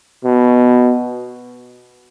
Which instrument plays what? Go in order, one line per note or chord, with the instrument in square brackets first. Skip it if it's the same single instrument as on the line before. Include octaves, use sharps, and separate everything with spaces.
[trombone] B2